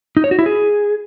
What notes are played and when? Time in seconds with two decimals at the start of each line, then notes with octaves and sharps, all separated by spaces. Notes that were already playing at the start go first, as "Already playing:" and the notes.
0.17 D#4
0.24 C#5
0.31 F#4
0.39 E4
0.46 G#4